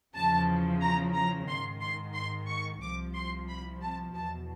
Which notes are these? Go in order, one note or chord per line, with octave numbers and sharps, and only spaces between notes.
E2 C#3 F3 A5
A#5
A#5
G#2 D#3 C6
C6
C6
C#6
C2 C3 F3 D6
C6
B5
A5
E2 B2 A5